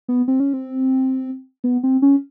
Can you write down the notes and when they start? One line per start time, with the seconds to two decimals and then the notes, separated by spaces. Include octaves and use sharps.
0.09 B3
0.28 C4
0.40 C#4
0.53 C4
1.64 B3
1.83 C4
2.02 C#4